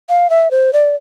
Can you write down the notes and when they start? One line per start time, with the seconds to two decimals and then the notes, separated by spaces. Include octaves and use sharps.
0.09 F5
0.30 E5
0.51 C5
0.73 D5